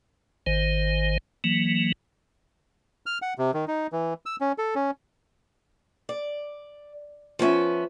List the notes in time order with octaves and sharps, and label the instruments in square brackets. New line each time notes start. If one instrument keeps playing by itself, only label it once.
[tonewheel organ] G#1 D#3 C5
E3 F#3 A#3
[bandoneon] F6
F#5
C3
D#3
D#4
E3
E6
C#4
A4
C#4
[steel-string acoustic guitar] D5
F3 B3 C#4 E5